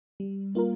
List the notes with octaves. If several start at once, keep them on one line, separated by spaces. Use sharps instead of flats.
G3
A#3 F4 A#4